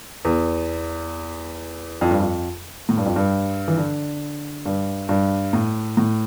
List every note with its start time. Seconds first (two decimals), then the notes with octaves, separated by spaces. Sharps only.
0.25 E2
2.01 F2
2.11 G2
2.20 F2
2.89 A2
2.97 G2
3.06 F2
3.16 G2
3.68 E3
3.77 D3
4.65 G2
5.09 G2
5.53 A2
5.97 A2